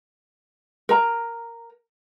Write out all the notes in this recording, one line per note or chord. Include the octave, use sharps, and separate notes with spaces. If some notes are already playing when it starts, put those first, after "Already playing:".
A#4 A#5